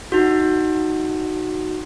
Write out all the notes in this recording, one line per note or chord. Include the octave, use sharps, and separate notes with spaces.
D#4 F#4